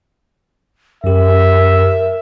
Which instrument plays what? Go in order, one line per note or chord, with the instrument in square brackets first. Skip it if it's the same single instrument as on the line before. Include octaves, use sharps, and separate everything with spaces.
[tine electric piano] F#2 G4 [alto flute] A#4 [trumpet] E5